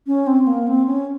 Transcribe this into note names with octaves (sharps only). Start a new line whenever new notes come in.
C#4
C4
A#3
C4
C#4